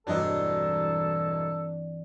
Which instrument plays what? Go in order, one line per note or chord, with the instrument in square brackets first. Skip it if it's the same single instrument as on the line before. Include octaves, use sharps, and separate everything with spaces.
[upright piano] E1 F#3 D#5 [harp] G2 E3 C4 [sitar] D4 [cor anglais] A4